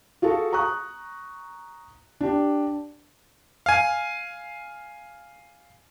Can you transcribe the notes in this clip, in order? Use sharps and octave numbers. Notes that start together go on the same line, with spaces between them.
F4 F#4 G#4 A4
A#5 C#6 D#6 F#6
D4 G4
F5 G#5